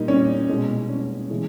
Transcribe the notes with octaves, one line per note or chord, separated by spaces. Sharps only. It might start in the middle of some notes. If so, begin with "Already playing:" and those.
Already playing: A#2 G3 A#3 D#4
C#4
B2 G#3
C#4
C#3 E3 G#3